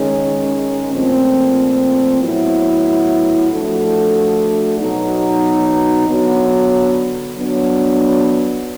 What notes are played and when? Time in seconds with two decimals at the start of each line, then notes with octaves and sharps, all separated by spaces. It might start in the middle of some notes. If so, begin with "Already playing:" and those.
Already playing: D#3 G#3 C#4
0.92 A#2 F3 A3 C4
2.21 A2 F#3 B3 E4 A4
3.50 F3 A3 D4 F#4 A4
4.79 B2 F#3 B3 D#4
6.08 D3 F#3 B3
7.37 F#3 B3 D4